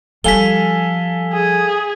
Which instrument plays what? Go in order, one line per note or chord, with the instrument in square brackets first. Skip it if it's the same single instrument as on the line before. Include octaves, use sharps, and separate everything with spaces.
[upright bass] F3 G3 [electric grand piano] A4 F5 G#5 [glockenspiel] B6 G7
[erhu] G#4